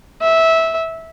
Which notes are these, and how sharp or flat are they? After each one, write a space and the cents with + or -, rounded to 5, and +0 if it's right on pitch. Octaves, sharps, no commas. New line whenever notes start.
E5 -15